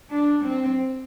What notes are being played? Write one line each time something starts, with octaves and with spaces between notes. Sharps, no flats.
D4
C4